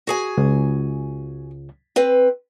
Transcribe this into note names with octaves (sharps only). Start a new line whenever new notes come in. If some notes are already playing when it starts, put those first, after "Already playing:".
F#4 G#4 G#5
C#2
C4 B4